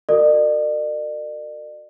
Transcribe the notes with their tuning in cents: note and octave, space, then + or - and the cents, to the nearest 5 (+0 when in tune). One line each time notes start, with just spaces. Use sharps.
F#4 +0 A#4 -35 D5 +45